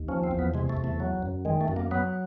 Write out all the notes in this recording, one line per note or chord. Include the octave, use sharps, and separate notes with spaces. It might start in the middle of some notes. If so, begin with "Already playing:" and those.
Already playing: D#2
F3 C#4
C4
E2
B3
C3 G#3
A3
E2
A3
F#3
F#2
D#3 G#3
A3
F#2
A#3
F#3 B3